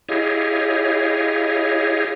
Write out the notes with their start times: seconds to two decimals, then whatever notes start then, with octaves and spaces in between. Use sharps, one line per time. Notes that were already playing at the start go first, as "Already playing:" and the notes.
0.09 E4 G4 G#4 C#5 D#5 F5